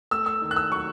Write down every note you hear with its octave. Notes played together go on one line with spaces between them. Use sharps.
A3 E6
E6
D#3
F#6
E6
F#3 C#6